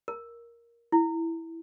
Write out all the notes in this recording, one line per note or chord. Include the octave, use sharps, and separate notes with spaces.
A#4
E4